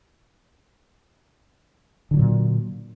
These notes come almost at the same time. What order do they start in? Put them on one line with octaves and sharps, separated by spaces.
D3 D#3 F#3 A#2